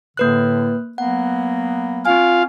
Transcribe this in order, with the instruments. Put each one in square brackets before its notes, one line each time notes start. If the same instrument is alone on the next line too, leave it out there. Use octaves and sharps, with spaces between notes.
[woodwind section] A2 D3 [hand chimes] A#3 B4 F#6
[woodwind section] F#3 A#3 B3 [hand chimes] F#5
[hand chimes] C4 G#5 [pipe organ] F4 F5